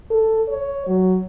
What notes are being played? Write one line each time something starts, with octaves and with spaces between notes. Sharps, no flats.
A4
C#5
F#3